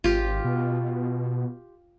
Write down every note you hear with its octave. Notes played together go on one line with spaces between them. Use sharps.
G#1 F4 G4
B2